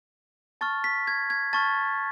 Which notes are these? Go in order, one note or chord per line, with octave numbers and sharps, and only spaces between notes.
A5 C#6 F6 A6
B6
G#6
G#6
A5 C#6 F6 A6